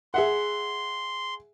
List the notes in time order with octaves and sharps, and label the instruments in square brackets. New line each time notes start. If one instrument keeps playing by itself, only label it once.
[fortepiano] G#4 E5 F#5 [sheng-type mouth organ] C6